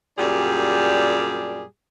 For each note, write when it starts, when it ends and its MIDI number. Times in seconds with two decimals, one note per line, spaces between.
0.18 1.62 42
0.18 1.62 46
0.18 1.62 55
0.18 1.62 62
0.18 1.62 67
0.18 1.62 68